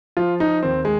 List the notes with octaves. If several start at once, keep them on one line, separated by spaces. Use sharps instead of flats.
F3 F4
D#4
D#2 C4
G#3